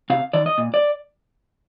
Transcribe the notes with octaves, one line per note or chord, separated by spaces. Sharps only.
C3 F5
D#3 D5
D#5
A#2
D5